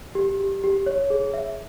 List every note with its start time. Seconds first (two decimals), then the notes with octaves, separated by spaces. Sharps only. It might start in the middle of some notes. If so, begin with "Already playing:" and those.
0.15 G4
0.40 G4
0.64 G4
0.86 C#5
1.10 G#4
1.34 E5